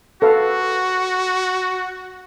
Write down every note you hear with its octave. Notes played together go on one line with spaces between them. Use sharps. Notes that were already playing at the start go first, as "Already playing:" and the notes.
F#4 A4 B4 F5